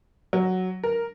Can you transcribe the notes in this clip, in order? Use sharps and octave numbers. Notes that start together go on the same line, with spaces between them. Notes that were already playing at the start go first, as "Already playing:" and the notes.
F#3
A#4